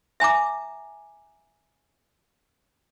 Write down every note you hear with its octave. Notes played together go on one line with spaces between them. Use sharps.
E5 G#5 A#5 D6